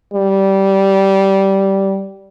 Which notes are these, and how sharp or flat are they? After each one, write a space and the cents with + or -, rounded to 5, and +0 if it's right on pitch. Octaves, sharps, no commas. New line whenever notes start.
G3 -15